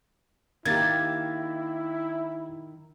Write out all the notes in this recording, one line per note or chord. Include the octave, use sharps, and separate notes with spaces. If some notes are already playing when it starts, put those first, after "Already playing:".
D#3 A#3 E4 G4 G#6 A6